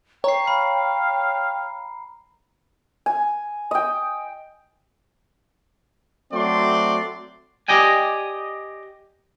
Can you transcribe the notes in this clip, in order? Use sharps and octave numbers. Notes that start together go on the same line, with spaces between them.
C#5 G5 A#5 C7
F5 B5
G#5
D#5 G5
F#3 A3 C4 F#4 D5 C6
G4 D5 D#5 G5 G#5